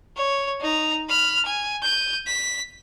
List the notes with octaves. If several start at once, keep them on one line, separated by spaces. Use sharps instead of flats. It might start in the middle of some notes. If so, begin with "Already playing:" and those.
C#5
D#4 A#5
B5 F6
G#5
G6 D#7
B6